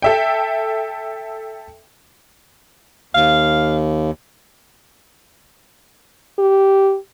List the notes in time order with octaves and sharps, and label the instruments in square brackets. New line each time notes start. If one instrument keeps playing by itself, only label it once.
[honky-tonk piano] A4 E5 G5
[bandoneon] D#2 [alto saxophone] F5
[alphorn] G4